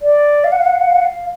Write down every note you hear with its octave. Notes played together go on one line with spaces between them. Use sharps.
D5
F5
F#5
F5
F#5
F5
F#5
F5
F#5
F5